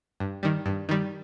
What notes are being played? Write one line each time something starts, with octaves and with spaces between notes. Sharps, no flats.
G2
D#3 G3
G2
D#3 G3